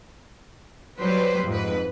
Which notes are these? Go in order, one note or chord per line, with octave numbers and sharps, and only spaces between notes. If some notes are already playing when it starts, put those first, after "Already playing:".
F#3 G3 B4 C5
F2 G#2 B4